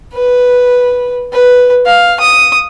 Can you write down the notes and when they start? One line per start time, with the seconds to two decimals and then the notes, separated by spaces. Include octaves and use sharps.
0.14 B4
1.33 B4
1.86 F5
2.20 D#6